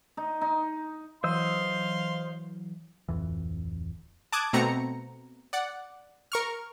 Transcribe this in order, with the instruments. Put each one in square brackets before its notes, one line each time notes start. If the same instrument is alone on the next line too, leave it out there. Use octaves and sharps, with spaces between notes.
[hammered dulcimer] D#4
D#4
[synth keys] E3 F#3 [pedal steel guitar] C5 D#5 E6 [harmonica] F5 C6
[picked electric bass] D1 F2 E3
[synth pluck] A5 D6 D#6 F#6 G#6
B2 A3 C4 A#5 C#7
D5 F#5
A#4 C#6 F6